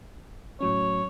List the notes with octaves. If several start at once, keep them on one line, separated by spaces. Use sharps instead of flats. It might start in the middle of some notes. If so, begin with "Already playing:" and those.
A2 F#3 C#4 C#5